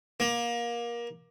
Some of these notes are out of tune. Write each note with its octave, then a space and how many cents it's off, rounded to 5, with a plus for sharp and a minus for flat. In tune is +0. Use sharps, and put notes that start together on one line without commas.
A#3 +25